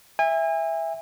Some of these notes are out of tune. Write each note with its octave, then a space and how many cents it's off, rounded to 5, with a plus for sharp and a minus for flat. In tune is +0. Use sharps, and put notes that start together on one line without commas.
E5 +0 G#5 -35